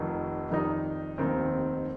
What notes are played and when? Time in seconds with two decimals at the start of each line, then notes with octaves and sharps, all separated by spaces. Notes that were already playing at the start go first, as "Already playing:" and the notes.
Already playing: F1 F2 D#3
0.50 F2 D#3 G3 D#4
1.18 F1 D#2 D#3 C4